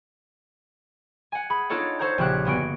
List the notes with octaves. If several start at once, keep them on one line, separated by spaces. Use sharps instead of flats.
F#5 G#5
G#4 B5
D4 D#4 F4 A4 C#5 F#5
A4 C5 C#5 F#5 A#5 G6
A#1 C#3 C4 G4 C#5 F#6
G1 A#3 B3 F#4 G#5 D7